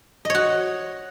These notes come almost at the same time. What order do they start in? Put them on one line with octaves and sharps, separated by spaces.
D#5 C#5 F#4